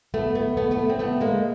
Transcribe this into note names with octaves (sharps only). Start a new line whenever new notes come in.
A3 B3
A3 B3
A3 B3
A3 B3
C4
A3 B3
G#3 A#3